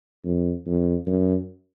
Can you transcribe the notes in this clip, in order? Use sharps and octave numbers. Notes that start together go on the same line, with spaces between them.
F2
F2
F#2